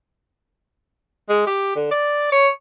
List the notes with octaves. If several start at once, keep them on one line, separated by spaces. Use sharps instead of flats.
G#3
G4
D3
D5
C#5